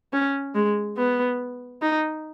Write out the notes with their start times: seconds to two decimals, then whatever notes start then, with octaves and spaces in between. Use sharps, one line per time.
0.13 C#4
0.55 G#3
0.97 B3
1.82 D#4